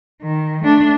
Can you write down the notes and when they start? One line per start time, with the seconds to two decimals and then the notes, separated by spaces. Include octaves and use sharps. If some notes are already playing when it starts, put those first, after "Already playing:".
0.23 D#3
0.64 A3 D4